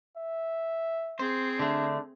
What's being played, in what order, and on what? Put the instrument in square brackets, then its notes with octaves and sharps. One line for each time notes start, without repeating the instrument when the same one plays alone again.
[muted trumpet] E5
[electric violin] C4 G#4 [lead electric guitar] C5
[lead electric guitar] D3 A3 [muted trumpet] D4